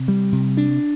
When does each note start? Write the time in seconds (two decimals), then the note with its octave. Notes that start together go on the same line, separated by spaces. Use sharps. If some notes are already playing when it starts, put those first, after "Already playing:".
Already playing: C3
0.08 G3
0.32 C3
0.57 D4